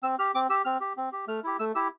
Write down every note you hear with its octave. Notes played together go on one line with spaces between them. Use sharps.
C4 E6
G4 F6
C4 D6
G4 E6
C4 F6
G4
C4
G4
A3 F6
E4 G4
A3 E6
E4 G4 E6